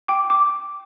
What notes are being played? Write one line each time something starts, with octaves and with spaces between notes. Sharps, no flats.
G5 D6
D6